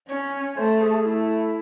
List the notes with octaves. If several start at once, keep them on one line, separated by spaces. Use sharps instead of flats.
C#4 C#5
A3 C5
G#4
A3 E4